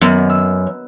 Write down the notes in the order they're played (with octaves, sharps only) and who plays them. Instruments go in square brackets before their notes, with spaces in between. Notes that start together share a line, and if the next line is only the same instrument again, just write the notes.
[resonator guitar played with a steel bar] F#2 [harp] D#3 B3
[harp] E6